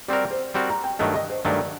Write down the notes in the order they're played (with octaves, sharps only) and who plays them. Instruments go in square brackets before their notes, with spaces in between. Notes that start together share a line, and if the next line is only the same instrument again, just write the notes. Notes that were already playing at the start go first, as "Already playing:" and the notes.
[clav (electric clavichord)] G3 C4 F#4 A#4 [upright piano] D5
[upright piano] C5
[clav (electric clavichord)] G3 C4 F#4 A#4 [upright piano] D5
[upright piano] A#5
G5
[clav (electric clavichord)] G2 D#3 F#3 A3 [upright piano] D#5
[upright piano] D#5
C5
[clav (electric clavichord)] G2 D#3 F#3 A3 [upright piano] D5